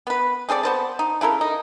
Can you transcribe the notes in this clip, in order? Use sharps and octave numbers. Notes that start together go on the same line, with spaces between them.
B3 B4
C4 G#4 A4 D5
B3 C5 A5
D#4
C#3 E4 A4 A#4
D#4